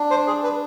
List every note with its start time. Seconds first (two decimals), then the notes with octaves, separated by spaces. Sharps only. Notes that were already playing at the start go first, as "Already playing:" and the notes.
Already playing: D4
0.11 C5
0.27 G#4
0.44 B4